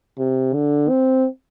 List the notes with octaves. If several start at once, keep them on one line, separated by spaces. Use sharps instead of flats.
C3
D3
C4